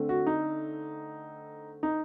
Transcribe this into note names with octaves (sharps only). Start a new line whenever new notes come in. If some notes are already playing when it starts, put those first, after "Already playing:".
Already playing: D3 A3 C4
F#4
D#4
D#4